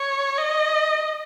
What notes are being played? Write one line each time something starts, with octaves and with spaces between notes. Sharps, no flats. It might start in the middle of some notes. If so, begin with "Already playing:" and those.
Already playing: C#5
D#5